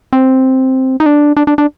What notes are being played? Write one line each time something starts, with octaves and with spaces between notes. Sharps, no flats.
C4
D#4
D4
D4
D4
D4